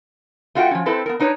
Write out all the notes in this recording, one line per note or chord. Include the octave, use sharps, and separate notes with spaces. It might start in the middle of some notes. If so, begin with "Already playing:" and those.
A3 F4 F#4 D#5 F#5 G5
F3 C#4
C4 E4 A4 B4 C5
B3 A#4
D4 D#4 B4 C#5